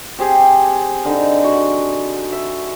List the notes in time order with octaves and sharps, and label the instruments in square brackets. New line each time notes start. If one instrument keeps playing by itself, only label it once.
[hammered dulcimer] C4 G4 G#4
D3 D#4
F#4
E5